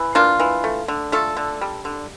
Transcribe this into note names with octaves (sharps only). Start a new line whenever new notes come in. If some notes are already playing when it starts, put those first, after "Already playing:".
Already playing: E3
A#3 D4 F4
E3
A3
D3
A3 F4 A4
D3
G3
D3